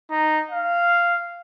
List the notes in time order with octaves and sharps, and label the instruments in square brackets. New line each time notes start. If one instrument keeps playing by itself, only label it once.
[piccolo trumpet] D#4
F5